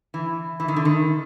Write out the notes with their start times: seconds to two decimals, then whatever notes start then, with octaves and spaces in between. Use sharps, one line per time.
0.14 E3
0.60 E3
0.68 D#3
0.76 D3
0.85 D#3